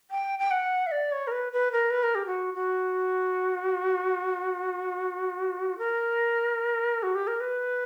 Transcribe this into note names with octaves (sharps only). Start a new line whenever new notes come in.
G5
G5
F#5
E5
D5
C#5
A#4
B4
B4
A#4
B4
A#4
G4
F#4
F#4
A#4
F#4
G4
A#4
B4